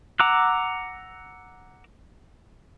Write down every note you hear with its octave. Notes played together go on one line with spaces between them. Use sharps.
F#5 A#5 D6 E6 F#6